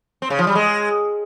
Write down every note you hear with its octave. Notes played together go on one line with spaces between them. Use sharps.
C4
C#3
F3
G3
G#3